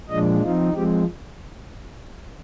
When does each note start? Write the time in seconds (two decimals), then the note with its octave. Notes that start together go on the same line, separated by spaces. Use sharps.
0.10 A#2 F3 G#3 D4 D#5
0.42 F3 C4 D#4 F4
0.73 F3 G#3 C4 G4